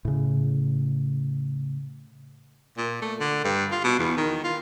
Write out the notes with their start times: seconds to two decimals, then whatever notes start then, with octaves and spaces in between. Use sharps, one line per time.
0.05 A2 C#3
2.77 A#2
3.02 A3
3.20 D3
3.44 G2
3.71 F4
3.84 B2
3.99 E2
4.17 D#3
4.44 F4